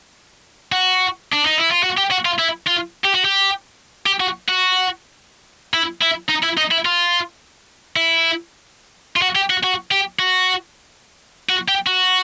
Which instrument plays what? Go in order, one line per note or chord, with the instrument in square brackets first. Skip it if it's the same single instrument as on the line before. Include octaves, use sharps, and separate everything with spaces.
[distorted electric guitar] F#4
D4
D#4
E4
F4
F#4
G4
F#4
F4
E4
F4
G4
F#4
G4
G4
F#4
F#4
E4
E4
D#4
E4
D#4
E4
F4
E4
F4
F#4
G4
F#4
F#4
G4
F#4
F#4
G4
F#4